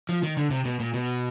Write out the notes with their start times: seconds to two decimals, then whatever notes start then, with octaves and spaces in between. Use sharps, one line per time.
0.09 F3
0.23 D#3
0.37 D3
0.51 C3
0.65 B2
0.80 A#2
0.94 B2